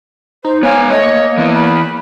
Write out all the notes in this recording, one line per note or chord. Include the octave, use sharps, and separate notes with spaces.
D#4 C5
B3 C#5 F5 G#5
A3 C#5 D#5
A#3
E3 B3 E4
B5